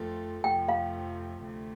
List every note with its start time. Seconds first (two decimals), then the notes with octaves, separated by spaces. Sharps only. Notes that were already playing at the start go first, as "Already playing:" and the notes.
Already playing: F2 F3 A3 C4 A4
0.44 F2 C3 F3 A3 G5
0.68 F5
1.43 D2 C3 A3